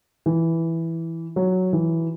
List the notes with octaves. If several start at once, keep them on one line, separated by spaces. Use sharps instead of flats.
E3
F#3
E3